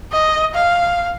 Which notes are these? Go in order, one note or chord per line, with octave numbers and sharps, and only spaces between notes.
D#5
F5